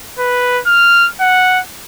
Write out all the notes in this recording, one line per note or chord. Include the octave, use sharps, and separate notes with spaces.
B4
F6
F#5